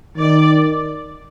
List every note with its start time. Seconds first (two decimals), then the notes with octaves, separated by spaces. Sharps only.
0.17 D#3 D5